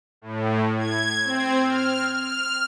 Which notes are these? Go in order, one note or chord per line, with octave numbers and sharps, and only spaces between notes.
A2
G#6
C4
F6
F6